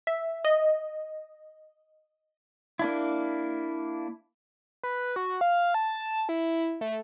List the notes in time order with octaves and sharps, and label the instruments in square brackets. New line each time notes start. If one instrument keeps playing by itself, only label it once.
[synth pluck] E5
D#5
[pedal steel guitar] A#3 D4 E4
[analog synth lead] B4
F#4
F5
A5
E4
A3